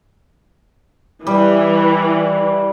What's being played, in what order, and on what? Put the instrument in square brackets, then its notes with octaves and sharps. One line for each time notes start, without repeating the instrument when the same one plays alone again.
[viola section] E3 [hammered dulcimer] G3